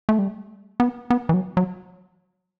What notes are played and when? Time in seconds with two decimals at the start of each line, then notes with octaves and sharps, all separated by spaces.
0.09 A3
0.19 G3
0.80 B3
1.10 B3
1.29 E3
1.34 F#3
1.57 F#3